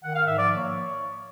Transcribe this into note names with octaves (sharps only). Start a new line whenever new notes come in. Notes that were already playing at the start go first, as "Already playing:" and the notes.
D#3 F#5
F5
G#2
E5
F3 D5
A#3 C#5